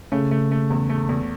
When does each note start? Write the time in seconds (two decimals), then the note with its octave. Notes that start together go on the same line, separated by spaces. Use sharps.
0.12 C#3 A3
0.31 A3
0.51 A3
0.70 E2
0.89 A3
1.09 E2